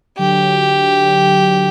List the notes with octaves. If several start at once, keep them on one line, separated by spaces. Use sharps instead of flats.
D3 F#3 G4